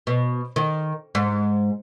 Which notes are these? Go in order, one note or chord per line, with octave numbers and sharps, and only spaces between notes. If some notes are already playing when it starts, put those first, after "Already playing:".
B2
D#3
G#2